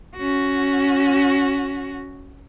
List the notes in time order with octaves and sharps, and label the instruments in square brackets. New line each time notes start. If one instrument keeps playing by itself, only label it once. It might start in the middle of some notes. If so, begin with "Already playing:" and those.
[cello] C#4 F#4